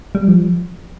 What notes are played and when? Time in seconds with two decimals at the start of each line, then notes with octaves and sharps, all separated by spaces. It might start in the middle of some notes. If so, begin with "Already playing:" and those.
0.15 G3
0.28 F3